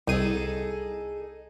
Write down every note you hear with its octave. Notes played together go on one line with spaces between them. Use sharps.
C2 D#4 G#4 A4 D#7